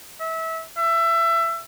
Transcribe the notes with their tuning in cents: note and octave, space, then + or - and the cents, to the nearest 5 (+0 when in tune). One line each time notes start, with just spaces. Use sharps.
E5 -25
E5 +25